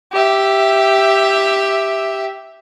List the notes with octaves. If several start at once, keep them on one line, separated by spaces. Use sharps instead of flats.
G4 E5